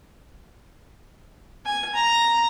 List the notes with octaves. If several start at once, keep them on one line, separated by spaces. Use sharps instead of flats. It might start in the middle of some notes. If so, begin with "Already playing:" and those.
G#5
A#5